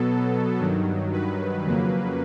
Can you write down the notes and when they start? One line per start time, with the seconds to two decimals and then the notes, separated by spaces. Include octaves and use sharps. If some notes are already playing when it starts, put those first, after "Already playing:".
Already playing: B2 F#3 B3 A4
0.60 G2 D#3 F#3
1.13 B4
1.65 F2 C#3 F#3 A#3